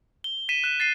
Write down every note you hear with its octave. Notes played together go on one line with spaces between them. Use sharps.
G7
B6 D#7 E7
F#6 E7
A6 C7 D#7